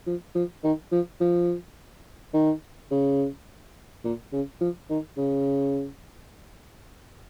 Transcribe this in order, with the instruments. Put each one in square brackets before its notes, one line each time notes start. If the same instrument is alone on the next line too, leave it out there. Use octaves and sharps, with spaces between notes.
[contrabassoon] F3
F3
D#3
F3
F3
D#3
C#3
A#2
C#3
F3
D#3
C#3